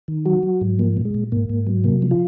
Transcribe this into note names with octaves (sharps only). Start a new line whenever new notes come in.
D#3
F#3 F#4
F#3
G#2
F3 A#3
A#2
G#3
A#2
G#2 A#3
G#2
F#3
C3 A#3
F3
F4